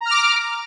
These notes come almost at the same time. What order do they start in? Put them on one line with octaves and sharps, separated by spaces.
A#5 F6 D6